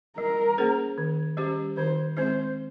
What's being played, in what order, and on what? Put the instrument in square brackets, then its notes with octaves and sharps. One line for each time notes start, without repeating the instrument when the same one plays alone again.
[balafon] G3 [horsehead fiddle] A#4
[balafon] A#3 C#4 G#4 C5
D#3
G3 C#4 G4 C5
[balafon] D#3 [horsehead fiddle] C5
[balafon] G#3 C4 [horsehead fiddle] C5